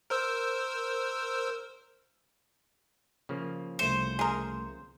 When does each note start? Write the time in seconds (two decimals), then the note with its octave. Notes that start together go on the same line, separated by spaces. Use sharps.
0.10 A#4 C5 E6
3.29 C#3 F3 A#3
3.79 C2 A3 C5 C#7
4.19 G#4 A#4